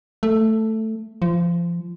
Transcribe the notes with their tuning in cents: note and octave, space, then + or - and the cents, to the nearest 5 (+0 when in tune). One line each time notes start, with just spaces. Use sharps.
A3 +5
F3 -25